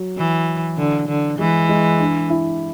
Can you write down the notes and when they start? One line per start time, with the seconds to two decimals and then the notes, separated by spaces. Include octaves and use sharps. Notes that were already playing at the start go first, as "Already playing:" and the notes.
Already playing: F#3
0.17 E3
0.78 D3
1.08 D3
1.39 E3 G#3
1.69 G#3
2.00 D4
2.30 E4